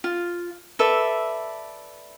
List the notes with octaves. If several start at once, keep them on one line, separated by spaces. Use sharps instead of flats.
F4
A4 B4 D5 E5